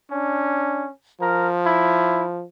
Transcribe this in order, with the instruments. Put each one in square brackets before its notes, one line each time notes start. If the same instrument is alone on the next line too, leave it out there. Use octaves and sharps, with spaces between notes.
[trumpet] C#4 [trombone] D4
[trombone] F3 [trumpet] A#4
[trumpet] E4